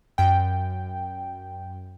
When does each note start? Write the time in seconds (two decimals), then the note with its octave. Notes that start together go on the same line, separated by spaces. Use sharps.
0.18 F#2 G5